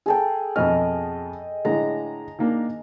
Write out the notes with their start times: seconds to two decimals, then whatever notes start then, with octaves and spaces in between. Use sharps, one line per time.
0.06 G#4 A4 G5
0.56 F2 B2 D#5 F6
1.65 A2 D3 G#3 A#5
2.39 D#3 A#3 D4